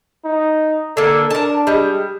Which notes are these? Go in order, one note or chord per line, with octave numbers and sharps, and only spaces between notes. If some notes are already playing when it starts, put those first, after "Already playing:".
D#4
D3 A#3 A4
D4 A#4 A5
G3 G#3